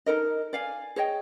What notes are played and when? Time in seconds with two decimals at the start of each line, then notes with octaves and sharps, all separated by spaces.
0.06 D#4 A4 A#4 D#5
0.53 D5 F5 G#5
0.96 G#4 C#5 D#5 G5